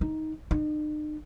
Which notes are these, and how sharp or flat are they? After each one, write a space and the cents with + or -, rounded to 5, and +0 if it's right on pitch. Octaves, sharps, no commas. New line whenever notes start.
D#4 +10
D#4 -45